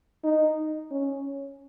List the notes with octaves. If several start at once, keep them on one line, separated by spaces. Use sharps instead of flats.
D#4
C#4